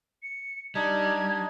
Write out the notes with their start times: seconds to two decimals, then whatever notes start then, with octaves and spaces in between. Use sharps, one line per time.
0.23 C#7
0.75 G3 D4 D#4 D#5 G#6